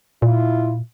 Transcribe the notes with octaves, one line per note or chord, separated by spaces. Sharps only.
A#2 E4 F4